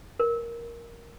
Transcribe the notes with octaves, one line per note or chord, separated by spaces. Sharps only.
A#4